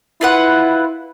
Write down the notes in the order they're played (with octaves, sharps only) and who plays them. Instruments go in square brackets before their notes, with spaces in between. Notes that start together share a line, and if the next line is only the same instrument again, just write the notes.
[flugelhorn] E4 [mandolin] F4 B4 F#5